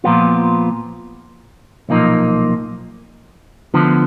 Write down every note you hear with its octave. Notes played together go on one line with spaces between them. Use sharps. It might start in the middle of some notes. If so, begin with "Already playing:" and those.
A#2 F3 B3 F4
B1 A#2 F3 A#3 D#4
D2 D3 F3 B3